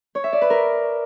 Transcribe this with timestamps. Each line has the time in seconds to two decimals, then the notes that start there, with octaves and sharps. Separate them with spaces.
0.15 C#5
0.24 E5
0.33 D5
0.41 B4
0.50 A#4